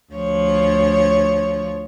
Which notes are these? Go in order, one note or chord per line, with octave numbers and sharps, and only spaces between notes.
D2 F3 C#5